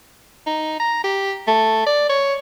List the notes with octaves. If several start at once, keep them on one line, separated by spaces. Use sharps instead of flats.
D#4
A#5
G4
A3
D5
C#5